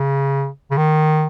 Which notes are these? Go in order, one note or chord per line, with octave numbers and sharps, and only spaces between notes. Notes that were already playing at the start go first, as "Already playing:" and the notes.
Already playing: C#3
C#3
D#3